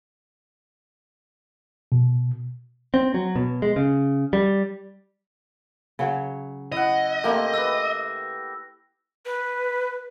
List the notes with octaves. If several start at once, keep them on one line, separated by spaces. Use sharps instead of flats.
B2
C4
F#3
B2
G#3
C#3
G3
C#3 F#3 C#5
E4 D#5 F#5
A3 A#3 C4 E4 G4
B4 E5 E6 A#6
B4